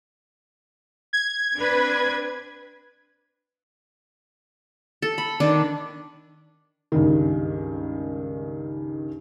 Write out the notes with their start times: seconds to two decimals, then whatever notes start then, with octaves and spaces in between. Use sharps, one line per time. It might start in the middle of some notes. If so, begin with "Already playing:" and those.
1.13 G#6
1.55 C4 D4 B4
5.02 A4
5.18 B5
5.40 D#3 D4
6.92 C#2 G2 D#3